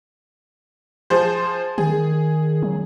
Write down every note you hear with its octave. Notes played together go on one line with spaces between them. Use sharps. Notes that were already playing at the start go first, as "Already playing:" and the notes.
F3 G#4 C5
D#3 G#4
F#3